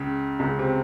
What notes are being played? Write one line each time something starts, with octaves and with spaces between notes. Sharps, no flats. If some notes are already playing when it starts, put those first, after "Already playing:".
Already playing: C#2 C#3
C#2 C#3
C3